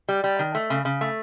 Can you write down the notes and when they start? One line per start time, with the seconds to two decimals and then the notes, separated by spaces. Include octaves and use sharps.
0.09 G3
0.24 G3
0.39 D#3
0.55 A3
0.70 C#3
0.85 C#3
1.01 A3